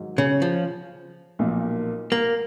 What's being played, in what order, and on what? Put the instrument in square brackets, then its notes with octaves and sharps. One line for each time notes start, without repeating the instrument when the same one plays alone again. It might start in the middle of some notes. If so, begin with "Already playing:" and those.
Already playing: [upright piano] G#2 D#3 F#3
[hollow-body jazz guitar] C#3
F3
[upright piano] B1 A#2 F3 A#3
[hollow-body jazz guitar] A#3